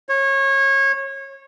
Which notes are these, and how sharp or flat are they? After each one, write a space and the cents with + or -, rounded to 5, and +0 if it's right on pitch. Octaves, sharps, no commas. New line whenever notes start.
C#5 -25